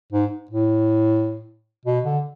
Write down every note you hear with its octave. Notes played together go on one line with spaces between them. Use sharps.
G#2
A2
B2
D3